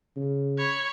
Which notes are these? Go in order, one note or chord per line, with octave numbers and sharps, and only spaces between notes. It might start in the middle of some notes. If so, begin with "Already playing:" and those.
C#3
C#5 B5